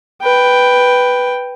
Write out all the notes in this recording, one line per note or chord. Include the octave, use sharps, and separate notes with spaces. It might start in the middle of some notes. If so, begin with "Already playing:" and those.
B4 G5